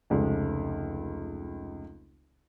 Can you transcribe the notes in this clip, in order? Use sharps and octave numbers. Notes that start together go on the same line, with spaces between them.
F1 C#2